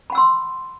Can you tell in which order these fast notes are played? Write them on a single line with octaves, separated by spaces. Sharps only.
B5 F#5 E6 C6